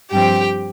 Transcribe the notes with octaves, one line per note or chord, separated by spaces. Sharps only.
G2 F3 C4 G4 G5